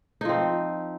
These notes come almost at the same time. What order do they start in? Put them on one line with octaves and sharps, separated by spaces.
D#4 F3 C4